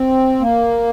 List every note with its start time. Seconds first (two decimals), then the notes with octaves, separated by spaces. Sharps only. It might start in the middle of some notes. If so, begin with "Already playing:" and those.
Already playing: C4
0.40 A#3